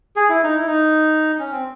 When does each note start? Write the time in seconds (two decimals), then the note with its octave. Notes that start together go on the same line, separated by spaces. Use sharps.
0.16 G#4
0.29 E4
0.44 D#4
0.55 E4
0.66 D#4
1.39 C#4
1.52 C4